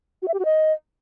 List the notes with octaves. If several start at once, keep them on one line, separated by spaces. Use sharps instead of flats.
F#4
E5
G4
F#4
D#5